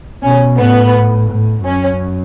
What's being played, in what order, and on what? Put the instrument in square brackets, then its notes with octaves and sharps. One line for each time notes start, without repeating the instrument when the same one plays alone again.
[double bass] B2 [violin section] C#4
[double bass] A2 [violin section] B3
[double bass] A2
[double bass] F#2 [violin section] C#4